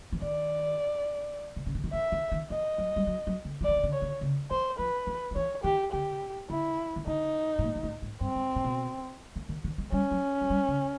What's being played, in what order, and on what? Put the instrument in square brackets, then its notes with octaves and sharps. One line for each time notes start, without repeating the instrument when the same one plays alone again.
[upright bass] E3
[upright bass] D#3 [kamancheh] D5
[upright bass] C3
C#3
D3
D#3
[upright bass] E3 [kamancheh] E5
[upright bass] D#3
D#3
[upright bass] E3 [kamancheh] D#5
[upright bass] F#3
G3
F#3
F#3
D3
F3
[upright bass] E3 [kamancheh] D5
[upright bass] D#3
D3
[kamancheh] C#5
[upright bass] D3
C#3
[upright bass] E3 [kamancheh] C5
[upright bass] F3 [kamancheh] B4
[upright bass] E3
F3
[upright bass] E3 [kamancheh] C#5
[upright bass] D#3 [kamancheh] G4
[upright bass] D3 [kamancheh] G4
[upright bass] D3 [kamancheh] E4
[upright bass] D#3
[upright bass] D3 [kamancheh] D#4
[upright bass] A2
A#2
G#2
A2
G#2
[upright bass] G2 [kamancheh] C4
[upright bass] G#2
A#2
B2
D#3
D#3
D#3
G#3
[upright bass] G3 [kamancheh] C#4
[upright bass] F#3
F#3
G3
C#3